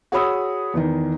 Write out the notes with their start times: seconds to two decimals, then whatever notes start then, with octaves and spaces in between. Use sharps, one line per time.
0.12 F#4 G#4 C#5 B5 D#6 E6
0.74 E2 D#3